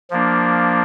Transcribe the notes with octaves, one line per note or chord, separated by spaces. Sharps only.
F3 A#3 D4